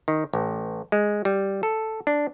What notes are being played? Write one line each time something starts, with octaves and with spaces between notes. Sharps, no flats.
D#3
A1
G#3
G3
A4
D4